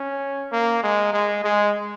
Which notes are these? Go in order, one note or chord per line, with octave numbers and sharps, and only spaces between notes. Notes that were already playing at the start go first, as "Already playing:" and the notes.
Already playing: C#4
A#3
G#3
G#3
G#3